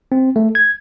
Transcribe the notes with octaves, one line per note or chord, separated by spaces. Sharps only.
C4
A3
G#6